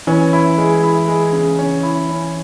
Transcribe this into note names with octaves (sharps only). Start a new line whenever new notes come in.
E3 C#4
E4
G#3
E4
G#3
C#3
C#4
E4
C#4